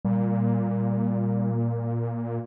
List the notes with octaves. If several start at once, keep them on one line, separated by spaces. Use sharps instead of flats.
A#2 G3